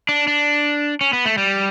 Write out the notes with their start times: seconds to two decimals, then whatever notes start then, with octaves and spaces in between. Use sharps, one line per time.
0.09 D4
0.27 D4
1.01 C#4
1.13 B3
1.26 A3
1.38 G3